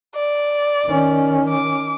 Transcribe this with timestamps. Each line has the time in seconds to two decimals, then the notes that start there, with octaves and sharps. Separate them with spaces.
0.15 D5
0.86 D#3 C#4
1.49 D6